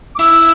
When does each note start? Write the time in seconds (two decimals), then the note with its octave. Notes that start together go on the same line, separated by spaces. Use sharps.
0.15 D6
0.19 E4 E6